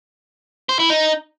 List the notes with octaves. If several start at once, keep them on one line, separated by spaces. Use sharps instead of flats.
C5
E4
D#4